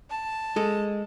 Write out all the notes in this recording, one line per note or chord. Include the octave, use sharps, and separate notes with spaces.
A5
G#3 A4